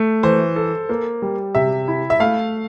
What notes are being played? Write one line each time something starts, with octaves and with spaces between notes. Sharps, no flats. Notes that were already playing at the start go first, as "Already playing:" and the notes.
Already playing: A3
E3 C5
A4
A#3
G3
C3 E5
E4
E5
A3 F5